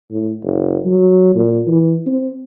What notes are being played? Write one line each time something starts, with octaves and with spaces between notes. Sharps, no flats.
A2
F#1
F#3
A#2
E3
C4